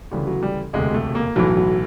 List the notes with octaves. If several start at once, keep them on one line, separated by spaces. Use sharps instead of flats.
D2 C#3 E3 G3
F#3
G3
E1 D2 C3 G#3
A3
A#3
B1 A2 E3 F#3
F#3